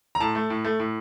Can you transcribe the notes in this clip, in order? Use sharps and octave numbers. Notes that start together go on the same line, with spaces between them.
A#5
A2 A5
A3
A2
A3
A2